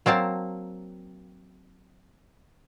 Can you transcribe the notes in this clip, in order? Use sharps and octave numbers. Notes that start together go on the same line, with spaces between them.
F#3 A#3 C4 A5